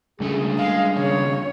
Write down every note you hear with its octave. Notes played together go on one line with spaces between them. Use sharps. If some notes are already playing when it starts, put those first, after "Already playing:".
C#2 G3 A3 C#4 D4 G#4
G#3 F5
D#2 C#3 C#5